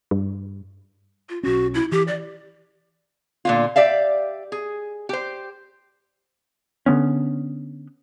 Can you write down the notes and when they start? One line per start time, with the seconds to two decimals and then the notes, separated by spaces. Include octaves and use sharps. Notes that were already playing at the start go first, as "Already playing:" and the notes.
0.11 G2
1.29 F4
1.43 B1 C#4 F#4
1.75 E4
1.92 E3 G4
2.08 D5
3.45 A#2 D3 F4
3.76 G4 D5 E5 F5
4.52 G#4
5.09 G4 C5
6.86 D3 F#3 B3 C#4